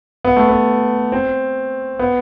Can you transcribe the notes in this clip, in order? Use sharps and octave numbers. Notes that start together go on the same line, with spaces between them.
B3
A3
B3
C4
B3